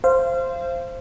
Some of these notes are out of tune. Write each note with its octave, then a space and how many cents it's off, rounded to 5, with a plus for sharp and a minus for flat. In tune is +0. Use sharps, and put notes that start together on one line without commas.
C5 +0 F5 -30